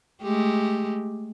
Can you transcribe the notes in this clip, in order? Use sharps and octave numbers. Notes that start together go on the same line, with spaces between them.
G#3 A3 G4